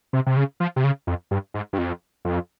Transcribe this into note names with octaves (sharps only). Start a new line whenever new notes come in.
C3
C3
C#3
F3
C3
C#3
F2
G2
G#2
G2
F2
F2